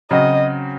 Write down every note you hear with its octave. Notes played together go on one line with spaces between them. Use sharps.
C#3 F#3 C4 F#4 D#5